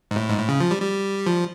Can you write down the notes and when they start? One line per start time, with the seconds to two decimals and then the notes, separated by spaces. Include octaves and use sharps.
0.11 G#2
0.16 A2
0.29 G#2
0.38 A2
0.49 C#3
0.60 F3
0.71 G3
0.82 G3
1.26 F3